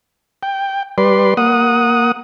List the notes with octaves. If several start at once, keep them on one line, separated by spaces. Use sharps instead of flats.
G5
G3 B4 D5 C6
A#3 F#5 D#6